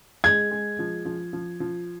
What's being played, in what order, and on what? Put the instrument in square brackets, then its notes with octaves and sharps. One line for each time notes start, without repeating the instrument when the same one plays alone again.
[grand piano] G#3 [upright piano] G#6
[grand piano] G#3
F3
F3
F3
F3